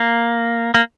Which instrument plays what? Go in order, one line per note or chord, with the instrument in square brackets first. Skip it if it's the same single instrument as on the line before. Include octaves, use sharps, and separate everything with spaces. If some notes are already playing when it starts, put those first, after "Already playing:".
Already playing: [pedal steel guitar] A#3
A#3